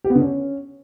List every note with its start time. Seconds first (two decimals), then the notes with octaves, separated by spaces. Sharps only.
0.04 G4
0.10 B3
0.15 D3
0.21 C#4